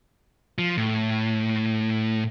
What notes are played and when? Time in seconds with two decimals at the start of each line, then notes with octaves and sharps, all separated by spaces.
0.58 F3
0.77 A2